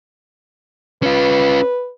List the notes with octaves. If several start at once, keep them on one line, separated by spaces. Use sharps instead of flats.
C#4 F4 B4